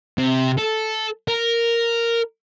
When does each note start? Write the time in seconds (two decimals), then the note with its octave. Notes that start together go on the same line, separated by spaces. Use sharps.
0.18 C3
0.59 A4
1.28 A#4